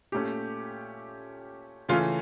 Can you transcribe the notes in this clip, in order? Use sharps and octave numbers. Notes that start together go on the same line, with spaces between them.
A#2 A3 C#4 G4
C#3 E3 A3 C#4 F4